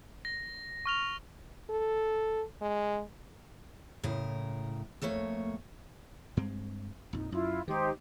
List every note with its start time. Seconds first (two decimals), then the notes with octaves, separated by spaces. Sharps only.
0.25 A#6
0.86 C#6 F6 F7
1.70 A4
2.62 G#3
4.03 A2 C#3 A#4
5.02 F2 A3 A#3 C#5
6.37 G2 G#3 C4
7.13 A#1 F2 D#4
7.32 F#2 E4 F4
7.68 D#3 G#3 D#4 G4 C5